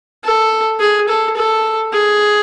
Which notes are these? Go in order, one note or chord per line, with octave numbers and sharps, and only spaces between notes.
A4
G#4
A4
A4
G#4